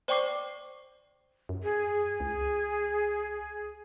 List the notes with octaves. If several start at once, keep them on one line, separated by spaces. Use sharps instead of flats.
C5 D5 G5 C#6 D6 C7
F#2
G#4
C#2